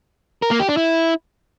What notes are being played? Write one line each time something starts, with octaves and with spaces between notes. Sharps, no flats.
A#4
A#3
G4
D4
E4